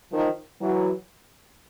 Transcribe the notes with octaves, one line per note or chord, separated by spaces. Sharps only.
D#3 F3
E3 F#3